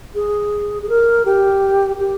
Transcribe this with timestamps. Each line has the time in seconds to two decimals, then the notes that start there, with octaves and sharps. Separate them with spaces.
0.15 G#4
0.82 G#4
0.89 A#4
1.26 G4
2.00 G4